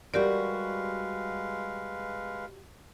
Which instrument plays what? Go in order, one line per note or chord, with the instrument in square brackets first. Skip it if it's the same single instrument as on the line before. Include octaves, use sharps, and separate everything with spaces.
[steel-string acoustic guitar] G3 F#4 [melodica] G#3 B4 F5 [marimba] G4 A#4 D5